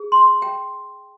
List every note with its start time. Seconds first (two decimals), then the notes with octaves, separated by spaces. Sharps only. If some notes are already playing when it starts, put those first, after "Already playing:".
Already playing: G#4
0.12 C6
0.42 G5